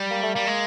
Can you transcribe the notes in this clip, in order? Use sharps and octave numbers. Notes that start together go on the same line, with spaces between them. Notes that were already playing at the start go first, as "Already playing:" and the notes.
Already playing: G3
A#3
A3
G3 A#3
G#3